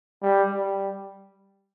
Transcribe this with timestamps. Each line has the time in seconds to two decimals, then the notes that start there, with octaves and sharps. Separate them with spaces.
0.22 G3
0.50 G3